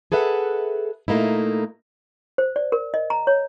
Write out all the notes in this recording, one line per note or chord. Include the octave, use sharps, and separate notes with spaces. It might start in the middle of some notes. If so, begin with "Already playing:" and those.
G#4 A4 B4 E5 F#5
A#2 A3 A#3 D#4 E4
C5
D5
A#4
D#5
A#5
C#5